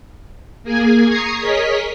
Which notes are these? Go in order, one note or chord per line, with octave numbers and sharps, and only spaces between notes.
A#3 G#4 G#5 G#6
A#5 C#6 D#6 G#6 C7
G#4 A#4 C#5 D#5 B6